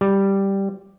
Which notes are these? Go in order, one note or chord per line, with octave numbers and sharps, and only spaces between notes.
G3